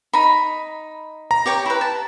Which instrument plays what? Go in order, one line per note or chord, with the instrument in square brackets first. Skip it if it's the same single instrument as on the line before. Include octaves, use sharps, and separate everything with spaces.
[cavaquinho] D#4 B5
[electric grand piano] A#5
[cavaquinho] G4 C#5 G5
E4 B4
A5